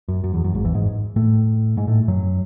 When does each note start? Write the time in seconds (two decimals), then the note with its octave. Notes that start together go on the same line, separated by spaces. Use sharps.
0.08 F#2
0.24 F#2
0.34 E2
0.44 F#2
0.54 G#1 G#2
0.64 E2 E3
0.75 G#2 G#3
1.16 A2 A3
1.77 G#2 G#3
1.87 A2 A3
2.08 F#2 F#3